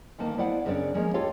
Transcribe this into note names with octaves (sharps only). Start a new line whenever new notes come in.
D2 D#3 A#3 A5
B3 E4 C5 D5 F5 F#5
F#2 C#3 C4 D4 D5
F3 G#3 A#3 C#4
F4 G4 A4 C#5 F5